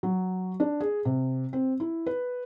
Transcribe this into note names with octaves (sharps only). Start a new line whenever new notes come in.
F#3
D4
G#4
C3
C4
E4
B4